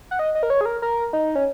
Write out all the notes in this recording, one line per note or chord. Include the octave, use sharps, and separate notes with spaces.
F#5
D#5
D#5
A#4
C#5
G#4
A#4
A#4
D#4
C#4